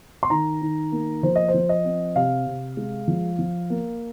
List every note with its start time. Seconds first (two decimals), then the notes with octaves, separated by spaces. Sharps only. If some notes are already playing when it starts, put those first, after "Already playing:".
0.23 C6
0.30 D#3 A#5
0.62 D#3
0.92 A#3
1.23 F3 C5
1.36 D#5
1.48 C5
1.54 F3
1.69 D#5
1.84 C4
2.15 C3 F5
2.47 C3
2.77 G#3
3.08 F3
3.39 F3
3.70 A#3